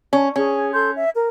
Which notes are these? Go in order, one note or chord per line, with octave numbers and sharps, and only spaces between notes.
C#4
C#4 G#4
A4 C6 G6
E5
A#4